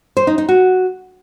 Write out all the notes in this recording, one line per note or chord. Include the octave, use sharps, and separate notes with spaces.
C5
D#4
D#4
F#4